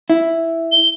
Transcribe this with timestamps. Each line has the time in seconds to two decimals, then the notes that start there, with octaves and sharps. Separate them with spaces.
0.10 E4
0.72 G7